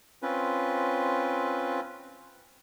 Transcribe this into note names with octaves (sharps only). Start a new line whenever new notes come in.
C4 C#4 F4 B4